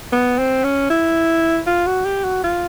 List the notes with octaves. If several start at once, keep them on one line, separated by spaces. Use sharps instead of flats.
B3
C4
C#4
E4
F4
F#4
G4
F#4
F4